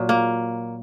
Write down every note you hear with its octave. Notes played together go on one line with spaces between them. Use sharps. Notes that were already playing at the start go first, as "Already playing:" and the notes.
Already playing: A#2 F#3
A#3